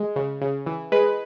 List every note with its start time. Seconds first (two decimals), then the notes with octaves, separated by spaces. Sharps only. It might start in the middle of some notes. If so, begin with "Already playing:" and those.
Already playing: G#3
0.16 C#3
0.41 C#3
0.66 E3
0.92 G#3 B4